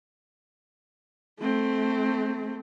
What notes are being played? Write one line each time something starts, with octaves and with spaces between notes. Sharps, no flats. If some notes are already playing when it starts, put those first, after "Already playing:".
A3 C4